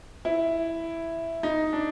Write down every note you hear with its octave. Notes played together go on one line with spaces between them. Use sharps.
E4
D#4
D4